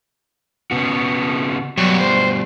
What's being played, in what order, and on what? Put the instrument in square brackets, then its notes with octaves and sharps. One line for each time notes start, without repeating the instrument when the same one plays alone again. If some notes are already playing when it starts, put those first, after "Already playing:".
[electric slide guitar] C#3 B3 F#4
[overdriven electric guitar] G2 B2 [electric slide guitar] F#3
[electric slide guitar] C5